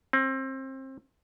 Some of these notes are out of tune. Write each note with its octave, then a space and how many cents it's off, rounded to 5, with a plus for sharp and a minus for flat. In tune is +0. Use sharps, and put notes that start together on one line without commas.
C4 +30